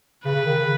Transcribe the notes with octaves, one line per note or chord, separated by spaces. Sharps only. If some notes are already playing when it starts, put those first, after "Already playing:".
C#3 B4
C#3
D#3
C#3